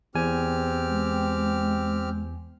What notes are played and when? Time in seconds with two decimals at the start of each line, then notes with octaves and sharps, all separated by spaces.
0.15 E2 C4 G4 G#5 F6
0.89 G#3